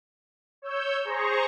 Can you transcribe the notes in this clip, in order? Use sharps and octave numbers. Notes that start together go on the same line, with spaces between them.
C#5 E6 G6
G#4 C5 A#5 C#6